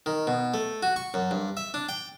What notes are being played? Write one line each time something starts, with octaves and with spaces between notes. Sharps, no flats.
D#3
B2
A3
F#4
C#6
F#2
G2
E5
D4
G5